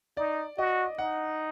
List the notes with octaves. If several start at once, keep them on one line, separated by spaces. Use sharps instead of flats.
D#4 D5
F#4 D#5
D#4 F#5